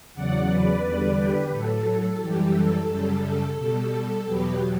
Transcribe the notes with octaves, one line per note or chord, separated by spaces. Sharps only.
E2 C#3 F#3 D5 F#5
B4 D5
E2 D3 G3
G4 B4
A2 F#3 A4
F#2 E3 G3 G4
A4
F#2 C#3 G3
A4
B2 G3 A4
E2 B2 F#3 G4 B4